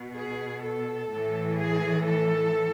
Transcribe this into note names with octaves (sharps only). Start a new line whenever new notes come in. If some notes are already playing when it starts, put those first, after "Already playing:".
Already playing: B2
G#4
A4
A2 E3
G#4
A4